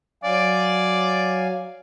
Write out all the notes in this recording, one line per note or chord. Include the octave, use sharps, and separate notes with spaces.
F#3 D5 F5 G#5